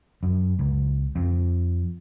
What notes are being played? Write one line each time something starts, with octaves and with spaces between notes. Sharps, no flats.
F#2
C#2
F2